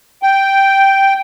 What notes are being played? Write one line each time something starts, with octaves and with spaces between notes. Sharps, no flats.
G5